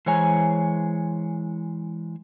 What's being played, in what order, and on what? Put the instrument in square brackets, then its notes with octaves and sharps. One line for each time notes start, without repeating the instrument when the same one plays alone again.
[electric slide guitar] E3 G#3 C5 C#5 G#5 A#5